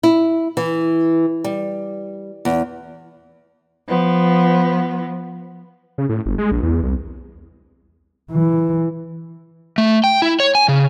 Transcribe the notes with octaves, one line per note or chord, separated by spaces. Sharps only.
E4
E3
G3
E2
F3 B3
C#3
A2
G1
G#3
A#1
E2
C2
E3
A3
G5
E4
C#5
G#5
C#3